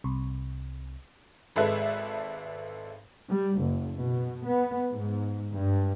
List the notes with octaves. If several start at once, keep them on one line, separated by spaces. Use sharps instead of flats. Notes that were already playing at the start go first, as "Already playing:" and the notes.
C2
G#1 G#3 A4 B4 E5
G3
F#1
B2
B3
G#2
G2